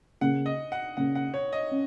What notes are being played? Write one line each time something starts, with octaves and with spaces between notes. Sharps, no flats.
C#3 A#3 C#4 F#5
D#5
F#5
C#3 A#3 C#4 F#5
F#5
C#5
D#5
C#4